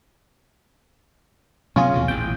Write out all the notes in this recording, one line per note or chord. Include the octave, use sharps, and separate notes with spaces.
C3 F#3 B3 C#4 F4 G#4
D#2 B2 E3
A1 A#2 G5